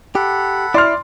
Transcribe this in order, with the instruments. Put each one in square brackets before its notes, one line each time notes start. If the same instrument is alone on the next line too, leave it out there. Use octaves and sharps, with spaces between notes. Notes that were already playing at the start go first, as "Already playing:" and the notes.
[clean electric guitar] G4 [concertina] A4 F#5 B5
[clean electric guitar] E4 [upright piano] D5 C6 F6